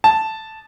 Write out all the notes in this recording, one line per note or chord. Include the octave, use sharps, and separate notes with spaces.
A5